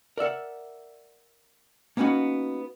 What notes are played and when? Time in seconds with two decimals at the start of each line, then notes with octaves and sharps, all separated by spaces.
0.17 A#4 D5 E5 F#5
1.97 A#3 B3 C#4 D#4 F#4